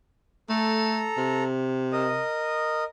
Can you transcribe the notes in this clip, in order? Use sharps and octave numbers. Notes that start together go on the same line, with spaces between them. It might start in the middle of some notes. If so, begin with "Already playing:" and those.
A3 A4 A#5
C3
A#4 D#5 D#6